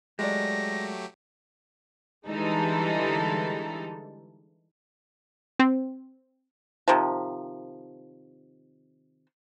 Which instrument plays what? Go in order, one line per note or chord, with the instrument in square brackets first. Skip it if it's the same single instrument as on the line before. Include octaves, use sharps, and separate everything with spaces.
[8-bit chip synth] F#3 A3 G4 [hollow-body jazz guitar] G#3 [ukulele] A#4 D5 [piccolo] A#6
[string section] D3 E3 G3 G#3 D#4 A4
[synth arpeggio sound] C4
[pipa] C3 D#3 F3